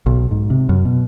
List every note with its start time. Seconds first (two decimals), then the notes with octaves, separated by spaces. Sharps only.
0.06 B1
0.31 G#2
0.50 C3
0.69 F#2
0.85 B2